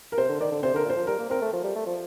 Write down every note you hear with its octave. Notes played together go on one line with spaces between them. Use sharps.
A#4
C3 C5
D3
D#3 D5
D3
C3 C5
D3 A#4
A#2 C5
F3
G3 A#4
A#3
C4 A#4
A3
F3
G3
A3
F3